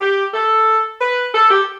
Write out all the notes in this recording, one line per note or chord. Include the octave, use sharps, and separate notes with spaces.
G4
A4
B4
A4
G4